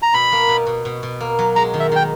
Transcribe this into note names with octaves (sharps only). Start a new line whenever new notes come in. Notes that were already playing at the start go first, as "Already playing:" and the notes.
A#5
B2 B5
A#3
B2
B2
B2
B2
A#3
F#3
G#3 A#5
D#3
E5
D#3 G5